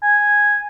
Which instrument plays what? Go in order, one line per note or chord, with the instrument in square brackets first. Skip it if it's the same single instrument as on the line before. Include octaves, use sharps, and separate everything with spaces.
[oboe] G#5